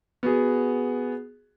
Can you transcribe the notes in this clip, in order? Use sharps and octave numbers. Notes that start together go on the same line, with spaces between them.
B3 F#4 G#4